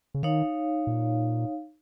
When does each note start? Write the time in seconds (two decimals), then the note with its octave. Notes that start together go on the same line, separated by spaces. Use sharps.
0.14 C#3
0.23 D#3 D#4 C#5 F5
0.87 A#2